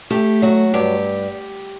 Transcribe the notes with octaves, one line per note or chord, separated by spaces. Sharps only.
A3 G4
F#3 F#4
G2 G4